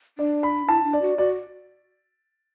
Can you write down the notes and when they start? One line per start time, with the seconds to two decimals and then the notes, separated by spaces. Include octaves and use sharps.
0.18 D4 D5
0.43 B5
0.68 E4 A5
0.84 D4
0.93 D5
1.02 F#4
1.18 F#4 D5